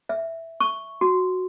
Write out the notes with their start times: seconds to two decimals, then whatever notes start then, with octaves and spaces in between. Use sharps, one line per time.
0.09 E5
0.60 C#6
1.01 F#4